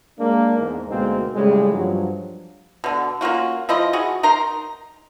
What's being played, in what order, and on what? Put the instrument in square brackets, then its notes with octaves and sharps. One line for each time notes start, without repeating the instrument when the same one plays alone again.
[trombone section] G#3 A#3 D4
E2 G#2
D2 B2 G#3 A#3 C4 D#4
A2 C#3 G3 G#3
G2 F3 F#3
[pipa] B2 D3
A#3 C#4 F4 F#4
F3 E4 F4 D#5
F#4 G#4
D#4 A#4 A#5 C6